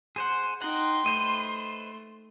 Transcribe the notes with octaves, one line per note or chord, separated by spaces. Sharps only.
G#4 C5 F#5 C6
D#4 F#5 G5 C6
A3 B4 C5 D#5